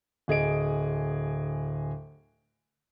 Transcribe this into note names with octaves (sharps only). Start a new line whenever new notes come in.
D1 G#4 D#5 D7